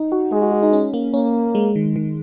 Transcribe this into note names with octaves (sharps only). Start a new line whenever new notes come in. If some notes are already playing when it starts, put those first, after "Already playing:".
Already playing: D#4
F#4
G#3 G#4
F#4
F#4
D#4
C#4
A#3
A#3 C#4
G#3
D#3
D#3